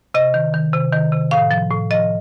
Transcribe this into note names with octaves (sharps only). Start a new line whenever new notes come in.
C3 D#5
D#3
D#3
C3
D#3
C3
A2 F5
F3
A2
F3 D#5